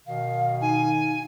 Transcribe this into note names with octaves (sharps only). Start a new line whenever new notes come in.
B2 D#3 F5
D#4 G#5